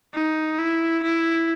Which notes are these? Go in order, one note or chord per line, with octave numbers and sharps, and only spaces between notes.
D#4
E4
E4